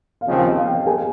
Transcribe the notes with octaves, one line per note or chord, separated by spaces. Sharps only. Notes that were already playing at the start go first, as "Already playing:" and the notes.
F5
D#2 C#3 F3 C4 D#5
F5
D#5
F5
G5
F5
G#4 G#5